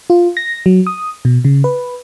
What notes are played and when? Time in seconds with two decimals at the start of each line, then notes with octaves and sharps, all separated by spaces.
0.10 F4
0.37 A#6
0.66 F#3
0.87 D#6
1.25 B2
1.45 C#3
1.64 B4